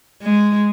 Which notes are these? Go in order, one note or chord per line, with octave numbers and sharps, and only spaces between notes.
G#3